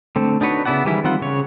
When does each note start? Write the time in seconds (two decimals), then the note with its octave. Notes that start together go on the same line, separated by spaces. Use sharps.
0.16 D3 A3 C4
0.41 D4 D#4 F#4 B4 C#5
0.65 C#3 B3 E4 D5 F#5
0.85 D#3 E3 G3 G#3 E4
1.04 D#3 G3 C4 F4 F#5
1.22 C#3 C#5